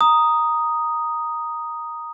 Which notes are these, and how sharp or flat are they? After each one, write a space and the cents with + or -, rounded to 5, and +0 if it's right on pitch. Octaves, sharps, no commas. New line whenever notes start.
A#5 +5 D#6 +0